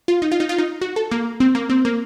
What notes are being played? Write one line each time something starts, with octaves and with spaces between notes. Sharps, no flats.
F4
D#4
F4
D#4
F4
D#4
F#4
A4
A#3
C4
A#3
C4
A#3